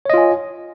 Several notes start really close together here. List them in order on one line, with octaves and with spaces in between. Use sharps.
C#5 D#5 F4 G#5